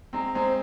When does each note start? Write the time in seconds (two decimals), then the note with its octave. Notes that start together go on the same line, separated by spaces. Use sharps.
0.13 G#3 C4 A#5
0.35 G#3 C4 C5